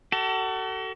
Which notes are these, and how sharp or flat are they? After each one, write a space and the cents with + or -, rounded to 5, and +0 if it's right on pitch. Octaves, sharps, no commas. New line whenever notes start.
F#4 +40 A4 +25